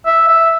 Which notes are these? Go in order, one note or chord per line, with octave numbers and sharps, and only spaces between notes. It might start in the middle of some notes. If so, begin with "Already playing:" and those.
E5
E5